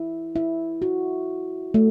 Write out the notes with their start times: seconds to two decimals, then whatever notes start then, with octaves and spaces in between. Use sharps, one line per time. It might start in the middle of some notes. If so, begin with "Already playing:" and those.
Already playing: E4
0.36 E4
0.82 F#4
1.74 A3